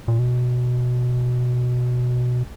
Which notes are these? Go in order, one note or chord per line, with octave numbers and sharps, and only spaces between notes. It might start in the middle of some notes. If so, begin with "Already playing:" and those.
A#2
B2